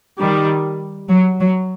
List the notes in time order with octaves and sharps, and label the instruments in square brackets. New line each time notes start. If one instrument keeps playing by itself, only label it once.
[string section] D#3 G3
F#3
F#3